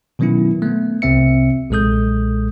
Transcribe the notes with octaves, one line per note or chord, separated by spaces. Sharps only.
B2 D#3 F#3 B3 C#4 E4
A3 B3
C2 C3 C4 E5 C#7
B1 A#2 G#3 A4 D#6 G6